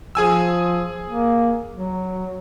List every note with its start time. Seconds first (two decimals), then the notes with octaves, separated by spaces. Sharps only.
0.15 F3 G#4 G#5 E6
1.06 A#3
1.74 F#3